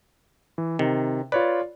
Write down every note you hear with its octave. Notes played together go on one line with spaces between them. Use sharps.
E3
C3 D#3
F4 B4 C#5 D5